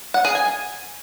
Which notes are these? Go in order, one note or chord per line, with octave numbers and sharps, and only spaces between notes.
F#5
G#4
G#5